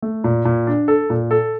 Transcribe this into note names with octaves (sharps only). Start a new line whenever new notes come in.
A3
A#2
A#2
D4
A4
A#2
A4